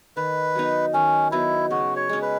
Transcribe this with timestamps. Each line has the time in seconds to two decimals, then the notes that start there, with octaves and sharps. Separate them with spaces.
0.17 D#3 B4
0.55 F#3 B3 D#4
0.94 D#3 C#4
1.32 F#3 B3 D#4 E4
1.70 C#3 F#4
1.96 C#5
2.09 G#3 C#4
2.22 B4